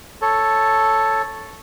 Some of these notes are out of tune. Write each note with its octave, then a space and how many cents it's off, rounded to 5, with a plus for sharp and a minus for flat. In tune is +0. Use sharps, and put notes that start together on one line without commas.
A4 +0 C#5 +0